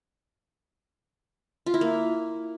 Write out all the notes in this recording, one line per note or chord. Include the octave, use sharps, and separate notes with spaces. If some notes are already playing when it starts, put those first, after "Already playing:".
F4
E4
A#3